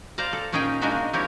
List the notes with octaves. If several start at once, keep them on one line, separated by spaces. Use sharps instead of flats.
C5 D5 F5 A#5
A4
A#2 C#4 D#4 G#4 A#4 G5
G#3 A#3 D4 D#4 F#4 E5
B2
F3 C4 E4 G4 A#4 C#5